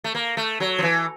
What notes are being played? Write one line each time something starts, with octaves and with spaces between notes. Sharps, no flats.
A3
A#3
A3
F#3
F3
E3